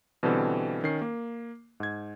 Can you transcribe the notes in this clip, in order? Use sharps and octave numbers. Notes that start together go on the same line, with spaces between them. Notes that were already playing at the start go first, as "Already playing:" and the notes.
B2 D3 E3 G3 C4 A4
D#3 C#4 C7
A#3
G#2 G#6